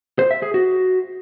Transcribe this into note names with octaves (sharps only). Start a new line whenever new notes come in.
C5
E5
G#4
F#4